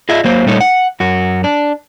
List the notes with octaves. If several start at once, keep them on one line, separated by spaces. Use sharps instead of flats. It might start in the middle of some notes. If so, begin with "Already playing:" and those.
F4 G#4 D#5 E5
F#3 A#3 C5
A#2 G3 A3 D#4 C#5
F#5
F#2 F#4
D4